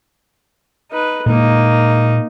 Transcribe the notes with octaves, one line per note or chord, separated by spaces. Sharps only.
D#4 B4
A#2 G#3 A#3 D#4